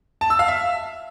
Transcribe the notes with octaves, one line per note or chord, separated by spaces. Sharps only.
A5
E6
F5
E5